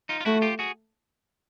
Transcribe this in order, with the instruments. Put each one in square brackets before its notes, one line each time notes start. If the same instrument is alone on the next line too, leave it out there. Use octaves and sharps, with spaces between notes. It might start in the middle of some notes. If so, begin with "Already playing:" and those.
[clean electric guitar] D#4 F4
F4
[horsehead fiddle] A3 [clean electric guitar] E4 F#4
[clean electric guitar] F4 G4
F#4 G#4